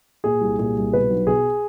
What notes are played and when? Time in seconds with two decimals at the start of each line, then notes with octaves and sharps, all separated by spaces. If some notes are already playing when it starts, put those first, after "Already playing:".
0.24 A#2 G#4
0.41 C2
0.59 A#2 G#4
0.76 C2
0.93 B2 B4
1.10 B1
1.27 B2 G#4